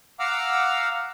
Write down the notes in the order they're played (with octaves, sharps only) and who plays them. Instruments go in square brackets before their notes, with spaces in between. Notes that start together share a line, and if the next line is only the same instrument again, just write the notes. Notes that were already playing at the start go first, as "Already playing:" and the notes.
[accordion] F5 F#5 A#5 D6 E6 F6